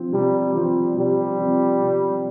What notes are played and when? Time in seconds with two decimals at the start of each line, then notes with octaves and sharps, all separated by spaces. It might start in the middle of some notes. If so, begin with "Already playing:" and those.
Already playing: F3 C4
0.12 C3 G3
0.55 F3 G3 C4
0.97 C3 G3
1.39 F3 C4
1.80 C3